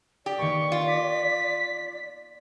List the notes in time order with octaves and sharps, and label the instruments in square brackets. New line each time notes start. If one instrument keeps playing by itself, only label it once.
[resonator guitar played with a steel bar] G4 [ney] D5
[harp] D#3 A#3 B3 [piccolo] C#6
[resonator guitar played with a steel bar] F4
[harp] D6 D7 [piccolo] B6